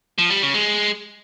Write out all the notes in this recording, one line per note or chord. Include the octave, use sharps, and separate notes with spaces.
F3
G3
C#3
G#3